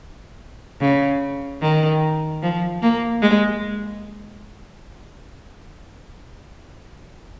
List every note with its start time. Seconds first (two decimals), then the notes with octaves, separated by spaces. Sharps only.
0.81 C#3
1.62 D#3
2.42 F3
2.82 A#3
3.22 G#3